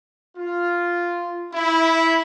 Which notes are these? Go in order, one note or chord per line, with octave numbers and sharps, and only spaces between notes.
F4
E4